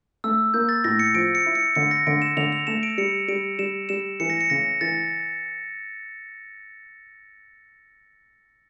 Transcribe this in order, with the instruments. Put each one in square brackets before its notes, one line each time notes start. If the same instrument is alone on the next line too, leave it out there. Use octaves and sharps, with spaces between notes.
[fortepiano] A3 [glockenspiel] E6
[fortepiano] A#3 [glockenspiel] G6
[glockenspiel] A6
[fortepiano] A2 [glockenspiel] A#6
[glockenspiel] C#7
[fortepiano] F3 [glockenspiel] D7
[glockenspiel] C#7
[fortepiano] E4
[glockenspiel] C#7
[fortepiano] D3 [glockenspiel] C#7
[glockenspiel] A#6
[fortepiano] D3 [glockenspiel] D7
[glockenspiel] E7
[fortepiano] D3 [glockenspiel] F7
[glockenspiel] F7
[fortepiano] A3 [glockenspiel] E7
[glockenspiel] D7
[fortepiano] G3 [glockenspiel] C#7
[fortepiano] G3 [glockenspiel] D7
[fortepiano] G3 [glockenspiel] E7
[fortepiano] G3 [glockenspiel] E7
[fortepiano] E3 [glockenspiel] C#7
[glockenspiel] A#6
C#7
[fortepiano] C#3 [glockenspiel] A#6
[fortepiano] E3 [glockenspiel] A6